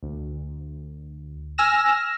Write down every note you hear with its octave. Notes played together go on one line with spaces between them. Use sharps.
D2
G#5 E6 F6 A#6 E7